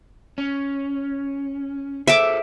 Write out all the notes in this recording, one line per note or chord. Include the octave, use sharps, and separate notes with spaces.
C#4
G#4 A4 C5 E5 D6